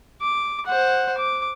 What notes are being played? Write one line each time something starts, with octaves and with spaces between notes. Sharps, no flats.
D6
C5 F#5
D6